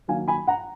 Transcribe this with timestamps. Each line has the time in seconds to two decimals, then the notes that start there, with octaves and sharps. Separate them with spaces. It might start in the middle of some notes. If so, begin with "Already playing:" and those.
0.08 D#3 F#3 A#3 F5 G#5
0.28 G#5 B5
0.47 F#5 A#5